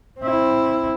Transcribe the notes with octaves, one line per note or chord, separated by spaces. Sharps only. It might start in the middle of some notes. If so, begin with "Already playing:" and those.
C4 E4